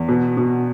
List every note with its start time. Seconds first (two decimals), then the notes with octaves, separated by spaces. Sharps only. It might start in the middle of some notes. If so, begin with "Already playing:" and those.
Already playing: E2
0.08 B2
0.37 B2